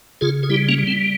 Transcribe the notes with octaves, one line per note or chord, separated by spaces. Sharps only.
C#3 F4 G#4
G#4
G3 E4 G4
A#3 C#4
G3
C4